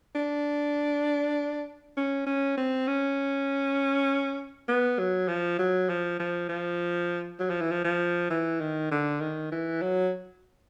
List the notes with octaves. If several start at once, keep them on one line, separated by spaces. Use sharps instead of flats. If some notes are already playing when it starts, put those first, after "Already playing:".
D4
C#4
C#4
C4
C#4
B3
F#3
F3
F#3
F3
F3
F3
F#3
F3
E3
F3
F3
E3
D#3
D3
D#3
E3
F#3